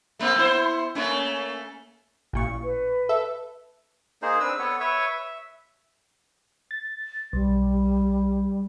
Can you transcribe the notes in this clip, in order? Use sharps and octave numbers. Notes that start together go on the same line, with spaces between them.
A3 A#3 C4
B3 E4 C5
A3 A#3 C#4
A1 A#2 C#6
B4
A4 E5
A#3 D#4 G#4 C5
C4 D4 B4 E6
B3 A4 B4 C#5
B4 C#5 E5
E5
A6
B1 G3